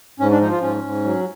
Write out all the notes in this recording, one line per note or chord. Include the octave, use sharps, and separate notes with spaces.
G#2 C#4
D4
F3 D#4
F4
G#2 C#4
G#2
F#3